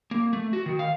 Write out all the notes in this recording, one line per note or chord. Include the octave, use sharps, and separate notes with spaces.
A#3
A3
F#4
D#3
F5